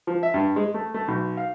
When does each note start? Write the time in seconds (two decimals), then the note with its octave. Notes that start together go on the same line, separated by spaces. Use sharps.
0.07 F3
0.23 E5
0.34 G2
0.56 G#3
0.74 A3
0.94 A3
1.08 B1
1.37 F5